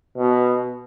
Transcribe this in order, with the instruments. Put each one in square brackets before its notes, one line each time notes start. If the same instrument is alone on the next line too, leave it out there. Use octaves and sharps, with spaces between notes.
[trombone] B2